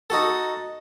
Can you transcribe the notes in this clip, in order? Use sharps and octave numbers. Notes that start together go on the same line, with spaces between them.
D#4 F#4 A4